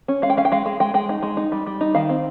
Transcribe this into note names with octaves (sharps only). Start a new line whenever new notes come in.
C#4
G#3 F5
G5
C#4 F5
G5
G#3 F5
G#3
G#3 G5
G#3 G5
D#4
G#3
D#4
G3
G3
D#4
D#3 F5
C4